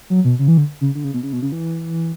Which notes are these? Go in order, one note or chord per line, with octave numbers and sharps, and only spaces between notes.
F#3
B2
C#3
E3
D3
C#3
D3
C#3
B2
C#3
B2
C#3
E3